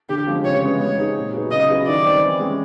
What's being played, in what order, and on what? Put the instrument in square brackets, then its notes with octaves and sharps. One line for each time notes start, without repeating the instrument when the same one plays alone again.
[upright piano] D3 [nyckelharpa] G4
[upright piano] F3 G#3 C4
[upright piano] C#3 [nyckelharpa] C#5
[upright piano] E3 G#3 B3
[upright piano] G#3 [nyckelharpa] C#5
[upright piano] C4 D#4 G#4
A#2
F#3 B3 D#4 G#4
[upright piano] C#3 [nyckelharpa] D#5
[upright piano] F#3 B3 E4 G#4
[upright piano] D#3 [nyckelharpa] D5
[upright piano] G3 C4
E3
G#3 C#4